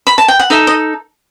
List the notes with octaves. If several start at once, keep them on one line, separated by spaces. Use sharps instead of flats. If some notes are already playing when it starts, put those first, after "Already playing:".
B5
A5
G5
F#5
D#4 A4 D#5 E5
D#5